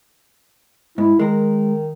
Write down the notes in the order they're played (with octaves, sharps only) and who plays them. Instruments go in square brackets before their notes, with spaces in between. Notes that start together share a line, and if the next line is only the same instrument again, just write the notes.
[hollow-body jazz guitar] G#2 [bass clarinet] E4
[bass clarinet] D#3 [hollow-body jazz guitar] G#3 A#4